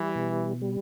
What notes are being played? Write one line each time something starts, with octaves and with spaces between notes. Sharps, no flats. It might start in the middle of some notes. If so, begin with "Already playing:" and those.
Already playing: E3 G3
B2
G3